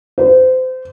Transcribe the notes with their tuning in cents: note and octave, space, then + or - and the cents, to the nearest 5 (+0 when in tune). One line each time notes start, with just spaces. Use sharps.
C5 -30